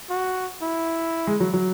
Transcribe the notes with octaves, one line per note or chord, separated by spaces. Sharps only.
F#4
E4
G#3
F#3
F#3